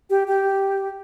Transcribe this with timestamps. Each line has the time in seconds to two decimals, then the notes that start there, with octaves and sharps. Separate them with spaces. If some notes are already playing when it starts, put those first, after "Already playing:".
0.10 G4
0.28 G4